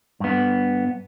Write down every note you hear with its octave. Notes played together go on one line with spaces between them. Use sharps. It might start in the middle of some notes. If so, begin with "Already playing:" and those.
G2 B3